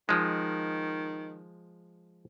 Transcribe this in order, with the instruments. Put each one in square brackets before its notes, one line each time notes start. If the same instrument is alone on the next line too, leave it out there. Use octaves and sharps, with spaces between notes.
[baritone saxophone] D#3 [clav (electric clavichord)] F3 G#3